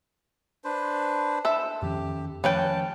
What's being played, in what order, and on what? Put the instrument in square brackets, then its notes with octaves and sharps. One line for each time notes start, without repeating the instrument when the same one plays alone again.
[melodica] D4 B4 C5
[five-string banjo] A4 E5
[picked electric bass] F2 D#3 C#4 [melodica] G4
[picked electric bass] D#3 F3 A3 [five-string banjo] C#4 B4 G5 [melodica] A5